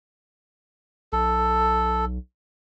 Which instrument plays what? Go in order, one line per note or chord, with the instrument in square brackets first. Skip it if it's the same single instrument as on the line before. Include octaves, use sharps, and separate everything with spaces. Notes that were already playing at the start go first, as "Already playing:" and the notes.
[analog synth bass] B1 [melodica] A4